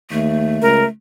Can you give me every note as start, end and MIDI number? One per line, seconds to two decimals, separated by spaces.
0.11 0.57 39
0.11 0.88 57
0.62 0.84 37
0.62 0.84 70